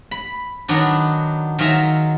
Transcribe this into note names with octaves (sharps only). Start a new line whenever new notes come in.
B5
D#3 F#3 B3 D4
D#3 F#3 F4 G#4 E5 A#5